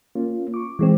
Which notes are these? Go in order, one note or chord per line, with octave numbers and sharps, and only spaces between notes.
A#3 C#4 F4
C#6 D6
E3 G#3 C4